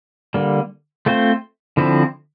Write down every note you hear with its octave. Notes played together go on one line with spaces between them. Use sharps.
D3 G3 A#3
A3 C4 F4 C5
D3 F3 C4 E4